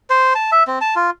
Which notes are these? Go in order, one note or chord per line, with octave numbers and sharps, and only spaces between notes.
C5
A5
E5
C4
A5
F4